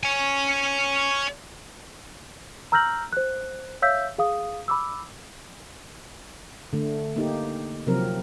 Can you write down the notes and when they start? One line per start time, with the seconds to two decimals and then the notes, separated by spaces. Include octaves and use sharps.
0.03 C#5 G#5
2.72 A#5 E6 F6 G6 A#6 F#7
3.13 C5 F#6
3.82 C#5 E5 F5 E6 G6 B6
4.18 G#4 F5 D#6
4.68 B5 D6 E6
6.73 D3 A3
7.16 A#3 D#4 G4
7.87 C3 F3 F#3 C4 A#4